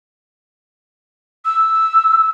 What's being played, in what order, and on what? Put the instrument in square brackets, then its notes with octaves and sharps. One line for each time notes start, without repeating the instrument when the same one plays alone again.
[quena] E6